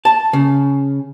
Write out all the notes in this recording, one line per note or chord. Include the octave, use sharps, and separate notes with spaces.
A5
C#3